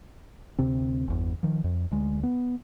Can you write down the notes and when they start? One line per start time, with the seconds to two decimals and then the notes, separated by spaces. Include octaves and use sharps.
0.59 D2 C3 C4
1.08 G1 E2
1.43 D#3 F3
1.64 F2
1.92 D2 G#3
2.23 B3